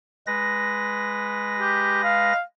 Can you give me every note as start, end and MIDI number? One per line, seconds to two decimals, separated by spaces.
0.27 2.33 56
0.27 2.33 71
0.27 2.33 94
1.60 2.01 67
2.04 2.41 77